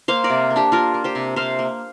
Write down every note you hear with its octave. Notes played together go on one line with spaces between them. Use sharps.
A#3 C5 F5
A#4 D5
C3
A#3
D4 G4
A#3 F4 A#4
A#3
G4 C5
C3
C3 C5 F5
A#3